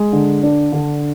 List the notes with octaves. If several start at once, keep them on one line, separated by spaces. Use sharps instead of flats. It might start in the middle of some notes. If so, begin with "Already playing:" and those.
Already playing: G#3
D3
D4
D3